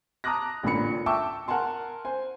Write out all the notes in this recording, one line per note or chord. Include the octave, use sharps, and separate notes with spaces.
A5 A#5 D6 D#6 F#6 A#6
A1 A#2 D3 B5 C#7
E5 G5 A5 C#6 D6 E6
A#4 F#5 G#5 A5 C6
C5 G#5